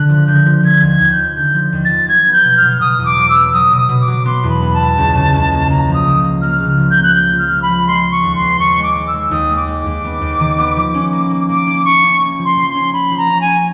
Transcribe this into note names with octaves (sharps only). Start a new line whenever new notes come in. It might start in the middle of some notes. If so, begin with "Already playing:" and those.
Already playing: D3 F#6
F3
D3 G6
F3
F3 G#6
D#2
G#6
D#2
G6
F3
D3 G6
F3
D#2
A6
F3
F#3 G#6
B3
G6
B2
F6
B2
B2 D#6
E2
D6
F#3
E6
B3
F#3 D#6
B2
D#6
B2
D6
F#3
B3 C6
E2
B5
B3
A5
B2
C#2
C#3
C#2
A#3
C#2 A#5
F3
D#6
C#3
A#3
A#3 F6
C#3
F3
G6
A#3
F#6
A#3 G6
F3
F6
F3
B5
F3
G#3 C6
G#3
C#6
D#2
C6
B3
D#2 C#6
G#3
D6
G#3
E6
G#3
D#2 D#6
G#3
D6
G#3
D6
D#2
B3
D#2
D#3
B3
F3
C#4
A#3
A#3
A#3 D6
C#4
C#4 C#6
C#4
A#3
F3
C6
F3
C#4 C6
C#4 B5
F3
A#5
C#4
G#5
C#4